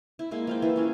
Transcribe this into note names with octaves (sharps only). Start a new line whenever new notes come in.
E4
G#3 A#3 E4
F3 F5 G5
E3 E4
F3 C#4 G#4